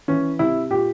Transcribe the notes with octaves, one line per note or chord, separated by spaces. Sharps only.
E3 C#4
C3 E4
A#2 G4